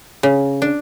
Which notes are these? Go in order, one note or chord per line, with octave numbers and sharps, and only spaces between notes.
C#3
D4